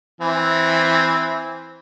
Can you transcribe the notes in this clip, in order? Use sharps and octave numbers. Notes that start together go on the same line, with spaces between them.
E3 C4